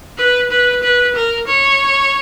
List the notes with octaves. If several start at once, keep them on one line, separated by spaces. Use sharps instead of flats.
B4
B4
B4
A#4
C#5